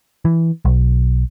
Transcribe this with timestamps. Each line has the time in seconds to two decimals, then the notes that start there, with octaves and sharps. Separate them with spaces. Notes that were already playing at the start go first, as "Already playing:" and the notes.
0.25 E3
0.65 B1